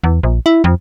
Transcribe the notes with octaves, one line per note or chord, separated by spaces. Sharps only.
E2
A#1
E4
F2